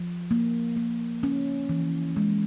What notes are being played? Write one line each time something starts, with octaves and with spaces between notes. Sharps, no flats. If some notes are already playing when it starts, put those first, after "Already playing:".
Already playing: F3
A#3
A#3
C#4
E3
G#3